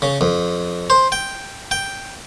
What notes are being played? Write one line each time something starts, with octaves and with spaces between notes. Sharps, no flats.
C#3
F2
C5
G5
G5